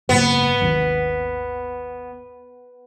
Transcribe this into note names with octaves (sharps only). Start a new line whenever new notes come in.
F#1 G#2 A#3 B3
G#1 D#2